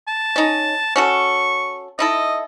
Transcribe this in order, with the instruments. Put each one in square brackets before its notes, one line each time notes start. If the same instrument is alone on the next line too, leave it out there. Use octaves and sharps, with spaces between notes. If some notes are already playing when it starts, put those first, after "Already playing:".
[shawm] A5
[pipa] C#4 D#4
[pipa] C#4 F#4 A4 [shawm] C#6
[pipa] D#4 E4 A4 [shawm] D#5